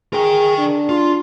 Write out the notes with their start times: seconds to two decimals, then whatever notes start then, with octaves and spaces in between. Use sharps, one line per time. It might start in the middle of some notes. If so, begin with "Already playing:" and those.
0.13 G#4 A#4 G5
0.58 D4
0.89 F4